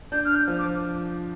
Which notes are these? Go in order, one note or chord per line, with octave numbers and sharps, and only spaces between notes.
D4 G6
F6
G6
F3
D6